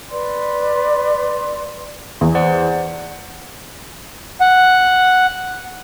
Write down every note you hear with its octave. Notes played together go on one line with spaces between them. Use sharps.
B4 D5 C6
E2
C5 D5 F#5
F#5